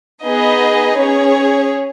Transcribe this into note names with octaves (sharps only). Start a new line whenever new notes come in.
B3 D#4 G#4 B4 D#5
C#4 G#4 C#5